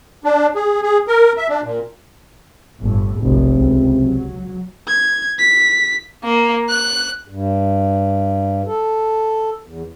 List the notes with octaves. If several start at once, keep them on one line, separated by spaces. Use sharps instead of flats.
D4
G#4
G#4
A#4
E5
D4
A#2
G1 A2
F1 B1 C3
C#2
F#3
G#6
B6
A#3
F#6
G2
A4
E2